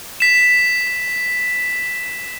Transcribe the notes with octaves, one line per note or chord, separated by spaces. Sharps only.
B6 E7